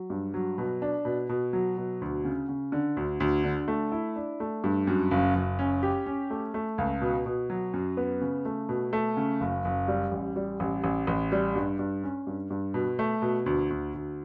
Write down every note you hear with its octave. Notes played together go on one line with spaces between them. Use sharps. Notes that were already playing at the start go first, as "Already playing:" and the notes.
Already playing: F#3
G2
F#3
B2
D4
B2
B2
F#3
B2
D2
C#3
C#3
D3
D2
D2
D3
A3
E4
D4
A3
G2
F#2
F#1
F#1
C#4
G4
C#4
A3
A3
C#2
B2
B2
F#3
F#2
B3
C#3
A3
B2
A3
C#3
F#1
F#1
G3
A1
G3
A1
A1
A1
G3
G2
G2
C#4
G2
G2
B2
A3
B2
D2
D2
D2